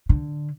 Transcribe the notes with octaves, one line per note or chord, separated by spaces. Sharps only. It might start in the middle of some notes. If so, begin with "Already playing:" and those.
D3